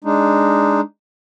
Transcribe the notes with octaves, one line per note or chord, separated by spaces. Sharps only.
G#3 D4 D#4